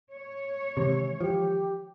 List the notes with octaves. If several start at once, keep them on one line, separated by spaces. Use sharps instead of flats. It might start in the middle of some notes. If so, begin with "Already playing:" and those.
C#5
C3 D#3 E3 G#3
F3 G4